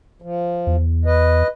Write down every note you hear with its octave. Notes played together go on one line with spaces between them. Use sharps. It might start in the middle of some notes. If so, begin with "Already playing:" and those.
F3
E2
B4 D#5